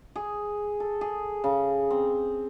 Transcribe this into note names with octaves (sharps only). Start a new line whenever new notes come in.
G#4
A4
G#4
C#3
C4